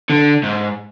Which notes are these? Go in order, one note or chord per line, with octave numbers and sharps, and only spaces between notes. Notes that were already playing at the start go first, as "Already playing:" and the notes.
D3
G#2